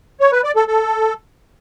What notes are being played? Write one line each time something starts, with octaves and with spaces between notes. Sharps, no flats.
C#5
B4
D5
A4
A4